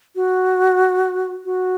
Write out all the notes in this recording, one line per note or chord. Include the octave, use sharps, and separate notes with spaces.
F#4
F#4